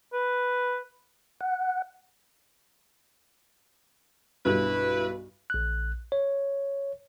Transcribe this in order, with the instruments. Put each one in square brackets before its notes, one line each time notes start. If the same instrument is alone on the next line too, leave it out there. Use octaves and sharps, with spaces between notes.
[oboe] B4
[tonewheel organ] F#5
[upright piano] B1 G2 [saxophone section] E4 B4
[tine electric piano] A#1 F#6
C#5